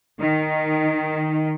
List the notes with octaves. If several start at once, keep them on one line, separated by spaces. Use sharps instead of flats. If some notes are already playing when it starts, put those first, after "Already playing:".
D#3